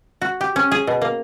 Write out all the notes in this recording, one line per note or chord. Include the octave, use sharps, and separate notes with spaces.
F#4
G4
C#4
G#4
B2
A#3